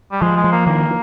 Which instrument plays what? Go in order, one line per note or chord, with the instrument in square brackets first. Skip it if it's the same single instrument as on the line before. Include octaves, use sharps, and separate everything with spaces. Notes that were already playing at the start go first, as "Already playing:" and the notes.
[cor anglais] G3
[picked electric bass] F3 [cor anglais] G#3
[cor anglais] G#3
[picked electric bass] F3
[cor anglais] A#3
[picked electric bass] D#3 [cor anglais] A#3